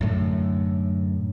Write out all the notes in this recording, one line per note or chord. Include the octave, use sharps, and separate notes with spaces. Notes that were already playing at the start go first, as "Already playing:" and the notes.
F#2 A2 D3